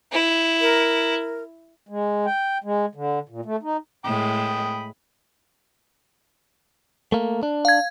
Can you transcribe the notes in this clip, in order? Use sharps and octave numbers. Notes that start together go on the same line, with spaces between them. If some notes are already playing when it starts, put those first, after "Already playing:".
E4
A#4
G#3
G5
G#3
D3
A#2
A3
D#4
A2 G#3 G5 B5 D#6
A3 A#3
D4
F5 G#6